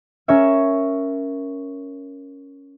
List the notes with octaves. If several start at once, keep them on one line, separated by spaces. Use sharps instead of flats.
C#4 A#4 C#5 E5